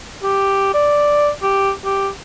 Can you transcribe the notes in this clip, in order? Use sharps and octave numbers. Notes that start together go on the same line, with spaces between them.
G4
D5
G4
G4